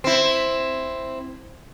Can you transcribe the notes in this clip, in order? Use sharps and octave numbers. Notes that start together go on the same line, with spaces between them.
C4 E4